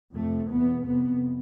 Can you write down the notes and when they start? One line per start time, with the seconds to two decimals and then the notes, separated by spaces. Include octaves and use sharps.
0.15 F2 C3 A3
0.50 E2 B2 B3
0.85 F2 C3 B3